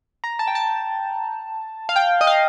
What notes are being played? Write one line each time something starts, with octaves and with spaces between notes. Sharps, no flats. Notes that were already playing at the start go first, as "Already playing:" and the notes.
A#5
A5
G5
A5
F5
G5
D#5
F5